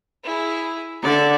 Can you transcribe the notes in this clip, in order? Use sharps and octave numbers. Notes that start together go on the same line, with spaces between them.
E4 G#4
D3 A4 D5 E5